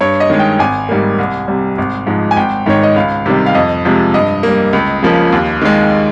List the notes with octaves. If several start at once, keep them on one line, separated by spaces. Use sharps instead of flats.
G2 C#5
D#5
D#3 G#3
G5
G#1 G#5
G#2 G3 A#3
C2
C3 G3
G#1
G#2 F3 G#3
G#5
G#1 G5
G#2 D#3 C#5
D#5
C#2 F5
C3 D#3 G3
F5
F2 D#5
C3 F3 G#3
G2 D#5
G3 A#3
C#2
C#3 F3 A#3
D#2
D#3 G#3